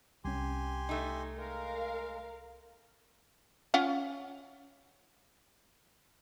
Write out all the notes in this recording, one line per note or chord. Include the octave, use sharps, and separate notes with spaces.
C2 C#4 G4 G#5 C6
A3 D#4
G#3 A#4 F5
C#4 F4 F#5